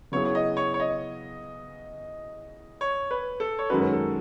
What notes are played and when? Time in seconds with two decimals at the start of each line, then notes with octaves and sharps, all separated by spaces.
0.12 C#3 F#3 B3 E4 G#4 C#5
0.25 C#5
0.35 D#5
0.57 C#5
0.74 C#5
0.80 D#5
2.81 C#5
3.11 B4
3.40 A4
3.59 C#5
3.70 F#2 D#3 G#3 C#4 F#4 B4
3.81 B4
3.93 A4